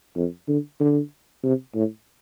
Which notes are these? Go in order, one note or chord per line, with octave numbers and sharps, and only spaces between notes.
F2
D3
D3
C3
A2